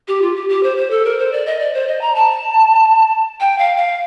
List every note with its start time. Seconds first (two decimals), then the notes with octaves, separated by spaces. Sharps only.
0.08 G4
0.22 F4
0.35 G4
0.49 G4
0.63 C5
0.77 C5
0.91 A4
1.05 A#4
1.19 C5
1.32 D5
1.46 D#5
1.59 D5
1.74 C5
1.87 D#5
2.01 A#5
2.15 A5
3.40 G5
3.58 F5
3.77 F5